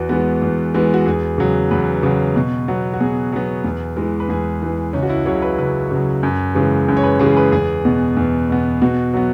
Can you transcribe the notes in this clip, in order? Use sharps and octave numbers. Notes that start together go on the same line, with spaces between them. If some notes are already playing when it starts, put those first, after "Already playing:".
Already playing: E2 F#4
E3 G#3 B3
E2
E3 G#3 B3
F#4
E2 G#4
C#3 F#3
E2 B4
C#3 F#3
B2
F#3 B3
F#4
B2 G#4
F#3 B3
E2
E3 G#3
B4
E2 G#4
E3 G#3
C#2 C#4
F#4
E4
C#3 F#3 C#5
B4
C#2 B4
C#3 F#3
F#2
C#3 E3 G#3
F#2
C#5
B4
C#3 E3 G#3 G#4
B4
E2 G#4
B2 B3
E2
B2 B3
B2 F#4
F#3 B3